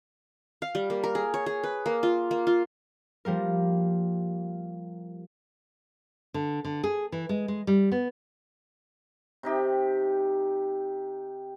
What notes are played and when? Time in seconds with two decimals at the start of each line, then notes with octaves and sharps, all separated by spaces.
0.62 F5
0.75 G3
0.90 A#3
1.04 A#4
1.15 G#4
1.34 C#5
1.46 G#4
1.63 B4
1.86 A#3
2.03 F4
2.31 A#3
2.47 F4
3.25 F3 G3 A#3 A#4
6.34 D3
6.65 D3
6.84 G#4
7.12 E3
7.29 G#3
7.48 G#3
7.67 G3
7.92 B3
9.43 C3 D#4 G4